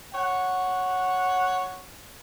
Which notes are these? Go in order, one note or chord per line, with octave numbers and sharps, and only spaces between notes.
C#5 F#5